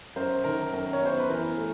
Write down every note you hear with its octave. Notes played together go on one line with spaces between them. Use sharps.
F#2 A#4 C5
D#3 A#4
F#2 A#4
C#5
B3 C5
B4
E3 A#4
A3